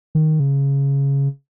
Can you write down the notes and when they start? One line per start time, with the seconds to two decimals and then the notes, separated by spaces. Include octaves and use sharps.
0.15 D#3
0.40 C#3